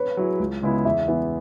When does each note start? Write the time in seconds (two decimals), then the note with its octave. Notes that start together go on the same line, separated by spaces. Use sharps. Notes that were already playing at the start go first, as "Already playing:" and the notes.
Already playing: B4 C#5
0.17 F#3 E4 G#4
0.40 C#2
0.62 C#3 G#3 B3 E4
0.85 E2 E5
1.08 E3 B3